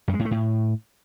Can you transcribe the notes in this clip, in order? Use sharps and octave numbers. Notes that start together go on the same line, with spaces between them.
F#2
G#3
A2
A3
A2